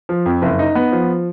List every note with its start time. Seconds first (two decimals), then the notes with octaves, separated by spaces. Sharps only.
0.09 F3
0.26 F2
0.42 F#1
0.59 D#4
0.75 B3
0.92 F3